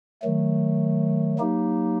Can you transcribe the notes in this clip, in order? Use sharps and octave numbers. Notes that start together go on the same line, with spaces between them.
D#3 F#3 A3
F#3 A#3 D#4 G4